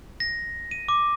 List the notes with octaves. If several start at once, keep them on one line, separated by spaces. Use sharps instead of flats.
A#6
D#7
D6